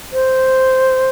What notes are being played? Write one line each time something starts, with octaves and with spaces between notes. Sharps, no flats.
C5